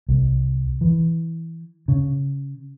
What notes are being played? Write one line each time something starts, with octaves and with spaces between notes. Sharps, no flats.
C2
E3
C#3